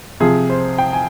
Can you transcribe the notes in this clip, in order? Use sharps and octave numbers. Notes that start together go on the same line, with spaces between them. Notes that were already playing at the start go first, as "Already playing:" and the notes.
C3 F3 G#4
C5
G5
G#5